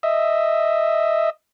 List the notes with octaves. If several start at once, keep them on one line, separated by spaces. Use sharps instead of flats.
D#5 E5